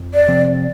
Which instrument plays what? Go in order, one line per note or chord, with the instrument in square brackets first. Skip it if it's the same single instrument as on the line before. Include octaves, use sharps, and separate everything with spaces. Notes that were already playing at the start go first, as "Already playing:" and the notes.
Already playing: [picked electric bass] F2
[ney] D5
[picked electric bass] C3 F3 C4